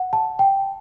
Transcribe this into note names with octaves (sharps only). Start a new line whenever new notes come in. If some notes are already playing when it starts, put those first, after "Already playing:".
Already playing: F#5
A5
G5